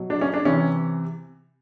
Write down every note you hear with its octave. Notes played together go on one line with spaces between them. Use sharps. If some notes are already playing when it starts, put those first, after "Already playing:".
Already playing: B2 F#3
D4
C#4
D4
C3 E3 C#4